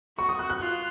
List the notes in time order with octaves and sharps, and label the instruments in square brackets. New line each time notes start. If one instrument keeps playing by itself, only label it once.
[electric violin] F#4 [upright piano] C#6
[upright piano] D#6
F#6
F#6
[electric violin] F4